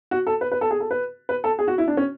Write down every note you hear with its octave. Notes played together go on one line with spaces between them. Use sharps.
F#4
A4
B4
B4
A4
G#4
A4
B4
B4
A4
G#4
F#4
E4
D4
C#4